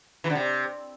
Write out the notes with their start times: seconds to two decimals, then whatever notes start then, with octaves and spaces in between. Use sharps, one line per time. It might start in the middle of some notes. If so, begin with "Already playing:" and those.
0.24 E3
0.30 D3
0.35 C3